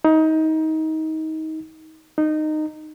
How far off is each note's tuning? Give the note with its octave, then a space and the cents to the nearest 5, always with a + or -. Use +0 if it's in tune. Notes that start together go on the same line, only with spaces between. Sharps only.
D#4 +25
D#4 -15